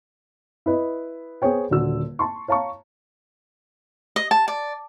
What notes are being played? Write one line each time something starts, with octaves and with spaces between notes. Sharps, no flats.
E4 B4 D#5
B3 G#4 C5 C#5 G5
D#1 D3 F#4 E6
A5 C6 C#6
C#5 F5 A5 A#5 C#6
D#5
A5
D5